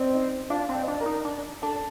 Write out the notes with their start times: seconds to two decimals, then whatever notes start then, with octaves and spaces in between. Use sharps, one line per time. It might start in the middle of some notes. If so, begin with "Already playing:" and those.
Already playing: C4 D5 D#5
0.13 D#4 D#5
0.50 D4 F4 F5
0.69 C4
0.75 D5
0.83 D#5
0.88 D4 D5
1.00 A#4 A#5
1.06 D#4
1.25 D4
1.62 D4 A4 A5